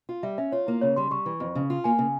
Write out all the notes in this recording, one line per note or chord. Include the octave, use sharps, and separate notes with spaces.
F4
G3 E5
C#4 E5
F4 C#5
A#3 E4
C#3 C#5
G3 C6
G3 C#6
E3
F2
C#3
F4
A#3 G#5
C#3